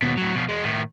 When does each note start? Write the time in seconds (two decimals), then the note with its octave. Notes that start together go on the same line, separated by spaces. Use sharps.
0.02 D#2 B2
0.17 A2 F#3
0.35 B2 F3
0.49 E2 G#3
0.64 A2 D#3